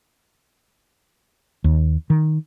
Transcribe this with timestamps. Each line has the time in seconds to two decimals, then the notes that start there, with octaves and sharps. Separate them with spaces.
1.64 D#2
2.10 D#3